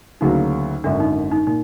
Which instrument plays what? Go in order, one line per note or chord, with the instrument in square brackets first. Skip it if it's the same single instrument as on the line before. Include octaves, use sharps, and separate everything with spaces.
[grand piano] D2 C#3 F#3 A#3 [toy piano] D#4
[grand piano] G#1 F#2 D3 [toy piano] D4
[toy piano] D#4
D#4
[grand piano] A#2 [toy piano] D#4